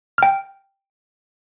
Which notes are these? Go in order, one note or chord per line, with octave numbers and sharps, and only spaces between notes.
G5 F6